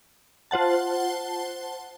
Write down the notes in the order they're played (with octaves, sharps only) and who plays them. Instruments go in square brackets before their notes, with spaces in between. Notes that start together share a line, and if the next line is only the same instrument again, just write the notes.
[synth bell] F4 C5 F#5 A5